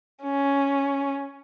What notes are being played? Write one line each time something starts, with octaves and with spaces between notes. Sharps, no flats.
C#4